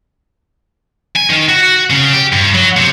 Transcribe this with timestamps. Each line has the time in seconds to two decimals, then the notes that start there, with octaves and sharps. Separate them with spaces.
1.16 G#5
1.30 D#3
1.49 F#4
1.90 C#3
2.13 G4
2.32 G2
2.54 F#3
2.77 C3